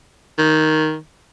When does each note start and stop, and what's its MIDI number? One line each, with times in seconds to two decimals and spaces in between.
0.38 0.98 51